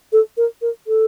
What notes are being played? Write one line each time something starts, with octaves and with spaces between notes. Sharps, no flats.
A4
A#4
A#4
A4